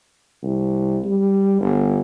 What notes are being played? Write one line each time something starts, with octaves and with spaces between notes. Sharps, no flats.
C2
G3
G1